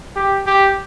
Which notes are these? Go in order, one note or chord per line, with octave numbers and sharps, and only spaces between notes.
G4
G4